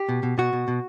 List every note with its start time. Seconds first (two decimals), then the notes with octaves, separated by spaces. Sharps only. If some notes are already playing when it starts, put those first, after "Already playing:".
Already playing: G4
0.09 B2
0.23 B2
0.38 B2 F#4
0.53 B2
0.68 B2